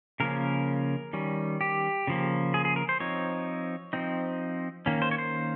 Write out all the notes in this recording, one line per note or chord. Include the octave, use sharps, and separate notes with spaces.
C#3 F3 A#3 C#4 A#4
D#3 G3 C#4
G4
C#3 F3 A#3
G#4
G#4
A#4
C5
F3 C4 D#4 C#5
F3 C4 D#4
D#3 A#3 C#4
C5
C#5
C5